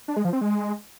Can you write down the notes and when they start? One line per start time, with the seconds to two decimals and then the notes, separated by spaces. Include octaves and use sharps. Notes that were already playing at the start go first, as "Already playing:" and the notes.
0.08 D4
0.16 G#3
0.25 F3
0.33 C4
0.41 G#3